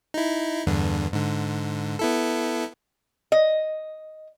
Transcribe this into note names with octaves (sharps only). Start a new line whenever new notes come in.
D#4 E4
E2 G2 D3
G#2 D3
B3 E4 A4
D#5